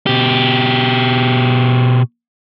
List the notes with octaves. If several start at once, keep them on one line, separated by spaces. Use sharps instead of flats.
B2 G4